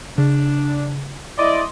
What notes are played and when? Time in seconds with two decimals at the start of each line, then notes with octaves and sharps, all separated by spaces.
0.18 C#3 D4
1.39 G#3 E4 D5 D#5 C6